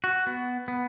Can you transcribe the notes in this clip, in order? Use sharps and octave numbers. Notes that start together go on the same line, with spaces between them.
F#4
B3
B3